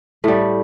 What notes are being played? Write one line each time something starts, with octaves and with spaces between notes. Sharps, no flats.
A2 G3 A3